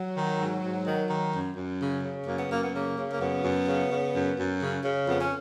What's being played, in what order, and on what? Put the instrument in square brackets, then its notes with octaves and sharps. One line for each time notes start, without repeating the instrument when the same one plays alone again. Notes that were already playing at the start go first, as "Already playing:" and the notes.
Already playing: [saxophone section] F#3
D#3
G#2
G#2
D#3
D#3
F#2
F#2
C#3
C#3
F#2 A#3
B3
F#2 A#3
B3
C#3 A#3
C#3
A#3
F#2 B3
F#2
C#3
C#3
F#2
F#2
C#3
C#3
F2 B3
C#4